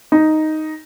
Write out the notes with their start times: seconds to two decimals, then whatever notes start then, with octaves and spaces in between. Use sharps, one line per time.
0.12 D#4